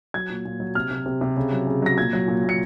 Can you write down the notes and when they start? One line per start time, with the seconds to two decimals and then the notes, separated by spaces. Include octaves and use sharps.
0.14 F#3 G#6
0.30 A#2
0.45 A#2
0.60 F#3
0.75 C3 F6
0.91 C3
1.06 C3
1.21 C3
1.37 C#3
1.52 F#3
1.67 C#3
1.82 F#3 A#6
1.98 A#2 G#6
2.13 F#3
2.28 A#2
2.44 A#2
2.49 C#7